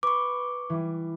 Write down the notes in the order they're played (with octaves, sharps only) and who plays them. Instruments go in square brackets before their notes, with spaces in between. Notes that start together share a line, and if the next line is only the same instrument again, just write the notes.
[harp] B4 [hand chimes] C#6 D6
[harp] E3 G3